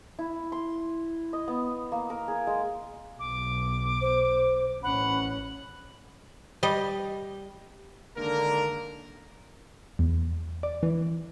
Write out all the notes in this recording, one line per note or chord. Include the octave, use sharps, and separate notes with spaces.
E4
C6
D#5
B3
A#3
A#4
G#4
G#3
B1 D6
C5
A1 C#4 F#5 B5
G3 D#5
D3 D#3 G#3 A#3 D4 A#4
E2
D5
E3